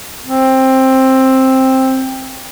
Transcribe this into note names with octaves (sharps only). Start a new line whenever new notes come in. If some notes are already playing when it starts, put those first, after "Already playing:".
C4